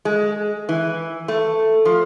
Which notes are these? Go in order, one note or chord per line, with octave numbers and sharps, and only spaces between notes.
G#3
E3
A3
F3